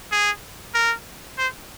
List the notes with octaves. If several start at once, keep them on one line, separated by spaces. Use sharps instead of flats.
G#4
A#4
C5